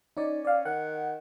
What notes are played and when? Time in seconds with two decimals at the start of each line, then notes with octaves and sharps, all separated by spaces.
0.17 C#4 D#4 D5
0.45 D5 F5
0.65 D#3 F#5